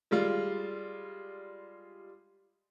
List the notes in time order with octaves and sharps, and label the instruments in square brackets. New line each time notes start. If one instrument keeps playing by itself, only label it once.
[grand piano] G3 G#3 F4